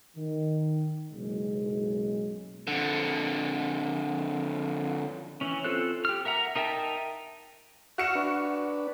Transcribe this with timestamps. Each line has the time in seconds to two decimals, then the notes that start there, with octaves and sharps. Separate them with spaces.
0.17 D#3
1.11 F#1 B1 G#3
2.67 F2 D3
5.41 E3 C#4
5.65 C4 F4 A4 C5 F#6
6.05 G4 F6
6.25 A#4 E5 F#5 A#5
6.56 D#4 A#4 E5 G5 A5
7.98 F#4 E5 F6 C#7 E7
8.15 D4 B4